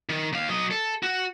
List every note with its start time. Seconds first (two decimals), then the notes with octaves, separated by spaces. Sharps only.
0.09 D#3
0.33 D#2 F5
0.49 F#3 D#5
0.71 A4
1.03 F#4